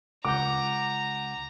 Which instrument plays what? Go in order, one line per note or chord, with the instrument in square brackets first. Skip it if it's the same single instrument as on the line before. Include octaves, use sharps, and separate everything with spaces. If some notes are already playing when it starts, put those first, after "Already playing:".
[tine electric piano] C#2 F#5 G6 [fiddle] A#5 [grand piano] D6